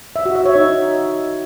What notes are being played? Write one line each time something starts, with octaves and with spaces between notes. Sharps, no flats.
E5
F#4
E5
C#5
D#4